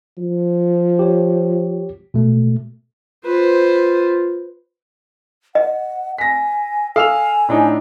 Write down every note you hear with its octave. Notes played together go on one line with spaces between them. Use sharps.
F3
G4 C#5
B2 A3
F4 B4 C5
D#5 F#5
G#5 A#6 B6
A4 F5 G#5 E6 F7
A2 D4 D#4